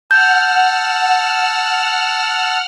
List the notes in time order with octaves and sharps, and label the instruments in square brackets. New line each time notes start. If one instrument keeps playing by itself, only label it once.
[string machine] F#5 F6 [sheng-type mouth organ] A5 E6 [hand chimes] G6